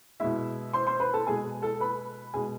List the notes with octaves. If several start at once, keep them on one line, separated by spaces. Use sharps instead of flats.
B2 G#3 E4 E5
C5 C6
C5 C6
B4 B5
A4 A5
B2 G#3 G#4 G#5
A4 A5
B4 B5
B2 G#3 G#4 G#5